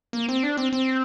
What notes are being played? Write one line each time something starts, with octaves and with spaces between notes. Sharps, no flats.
A#3
C4
D4
C4
C4